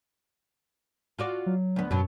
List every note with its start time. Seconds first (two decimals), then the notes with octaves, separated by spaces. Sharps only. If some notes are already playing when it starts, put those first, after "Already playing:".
1.19 F4 F#4 D5
1.46 F#3
1.76 D2 B3
1.91 F#2 B2 F#3